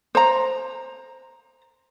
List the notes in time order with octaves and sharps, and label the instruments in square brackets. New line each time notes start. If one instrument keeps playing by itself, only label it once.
[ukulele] C5 A#5